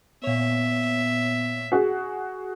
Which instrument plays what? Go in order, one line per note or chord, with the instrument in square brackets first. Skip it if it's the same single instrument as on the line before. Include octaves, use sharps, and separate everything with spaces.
[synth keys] A#2 C#5 [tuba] B3 [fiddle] E5
[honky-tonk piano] F#4 G#4